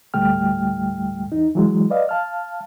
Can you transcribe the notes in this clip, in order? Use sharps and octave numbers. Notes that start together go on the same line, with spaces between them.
D2 A2 G3 A3 G5 F6
E2 D#4
E3 F#3 G#3
B4 D5 D#5 F5
F5 A5 F6